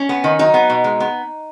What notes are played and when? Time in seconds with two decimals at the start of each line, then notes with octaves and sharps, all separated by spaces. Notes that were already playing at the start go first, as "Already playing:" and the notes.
Already playing: C#4
0.09 B3
0.24 D#3
0.39 F#3 D#4
0.54 B3
0.70 B2
0.84 G#3
1.00 B3